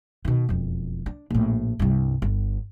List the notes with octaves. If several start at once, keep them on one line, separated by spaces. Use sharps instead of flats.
B2 D#3
E1 F2
D4
A#1 A2
C2 G2
G1